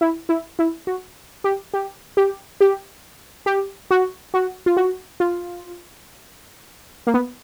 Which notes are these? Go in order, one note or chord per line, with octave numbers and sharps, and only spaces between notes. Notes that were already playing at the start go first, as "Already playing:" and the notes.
E4
E4
E4
F#4
G4
G4
G4
G4
G4
F#4
F#4
F4
F#4
F4
A#3
B3